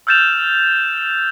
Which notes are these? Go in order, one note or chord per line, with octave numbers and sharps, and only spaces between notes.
E6 F6 G6 A6 E7 F7